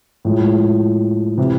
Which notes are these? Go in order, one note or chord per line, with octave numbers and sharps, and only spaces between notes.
A2 F3 G#3
C3 E3